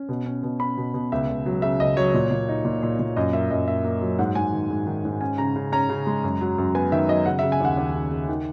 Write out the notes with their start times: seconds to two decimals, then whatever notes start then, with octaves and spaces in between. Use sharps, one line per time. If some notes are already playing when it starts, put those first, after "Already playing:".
Already playing: C#4
0.09 B2
0.26 C#4
0.43 B2
0.60 C#4 B5
0.77 B2
0.94 B2
1.12 C#2 E5
1.29 C#2
1.46 F#3
1.62 C#3 E5
1.80 C#2 D#5
1.97 F#3 C#5
2.14 A#2
2.31 A#2
2.48 D#4
2.65 A#2
2.83 A#2
2.99 A#2
3.16 F#2 D#5
3.33 A#3 E5
3.50 F#2 D#5
3.67 A#3 E5
3.85 A#3
4.01 F#3
4.19 G#2 F#5
4.35 G#2 G#5
4.53 D#3
4.70 G#2
4.87 D#3
5.05 G#2
5.21 C#4 G#5
5.38 C#3 A#5
5.56 C#3
5.72 C#4 A#5
5.89 C#3
6.07 G#3
6.24 F#2
6.41 F#3
6.58 F#2
6.75 B3 G#5
6.92 D#3 E5
7.09 F#3 D#5
7.26 C#3 F#5
7.39 C#3 E5
7.52 G#5
7.61 D#2 F#5
7.77 D#2
7.94 C#3
8.11 C#3
8.29 D#3